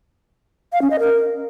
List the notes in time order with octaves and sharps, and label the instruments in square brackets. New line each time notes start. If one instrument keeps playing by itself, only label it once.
[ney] F5
C#4
D#5
A#4